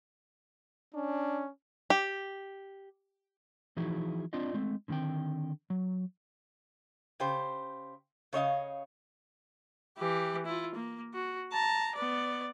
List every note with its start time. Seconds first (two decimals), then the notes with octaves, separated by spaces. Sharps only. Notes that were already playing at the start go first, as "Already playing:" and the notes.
0.94 C#4 D4
1.90 G4
3.77 E3 F3 D#4 E4 F#4 G#4
4.33 C4 D4 F4 D5 D#5
4.54 G#3 A3 C4
4.88 D3 D#3 A#3 C4 G5
5.70 F#3
7.20 C#3 G4 C5
8.33 C#3 C#5 D#5 F5
9.98 E3 G4
10.46 E4 F4
10.75 A#3
11.14 F#4
11.52 A5 A#5
11.96 B3 D5